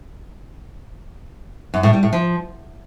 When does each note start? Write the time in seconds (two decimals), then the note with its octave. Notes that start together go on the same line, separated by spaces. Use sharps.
1.74 F#2
1.83 A2
1.93 G3
2.03 A2
2.13 F3